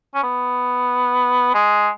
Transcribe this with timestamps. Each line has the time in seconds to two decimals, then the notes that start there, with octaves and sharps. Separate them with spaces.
0.15 C#4
0.23 B3
1.55 G#3